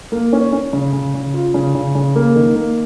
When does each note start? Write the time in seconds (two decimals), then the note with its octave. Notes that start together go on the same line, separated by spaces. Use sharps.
0.12 A#3
0.33 C#4
0.53 C#4
0.73 C#3
0.93 C#3
1.14 C#3
1.34 F4
1.54 C#3
1.75 C#3
1.95 C#3
2.15 A#3
2.35 D#3
2.56 A#3